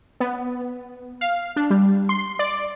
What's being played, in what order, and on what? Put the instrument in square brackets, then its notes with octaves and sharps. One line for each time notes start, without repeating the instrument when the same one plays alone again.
[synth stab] B3
F5
D4
G3
C6
D5